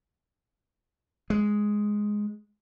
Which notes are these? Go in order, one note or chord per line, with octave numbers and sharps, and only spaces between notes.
G#3